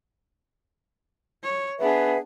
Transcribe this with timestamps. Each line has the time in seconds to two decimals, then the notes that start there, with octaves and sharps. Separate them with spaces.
1.43 C#5
1.80 B3 D4 G#4 B4 E5 F#5